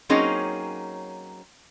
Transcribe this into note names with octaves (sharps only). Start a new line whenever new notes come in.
F#3 A#3 C4 C#4 D#4 G#4